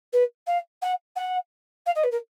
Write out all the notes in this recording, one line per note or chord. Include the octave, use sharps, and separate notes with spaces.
B4
F5
F#5
F#5
F5
D#5
B4
A#4